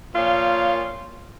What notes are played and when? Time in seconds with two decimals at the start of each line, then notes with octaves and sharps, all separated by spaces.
0.14 A#2 F3 A#3 F4 C#5 F5